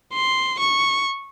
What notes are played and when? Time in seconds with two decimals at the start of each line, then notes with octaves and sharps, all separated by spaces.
0.13 C6
0.59 C#6